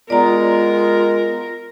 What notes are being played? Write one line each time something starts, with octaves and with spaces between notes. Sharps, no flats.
G#3 B3 F4 A#4 D5 A#5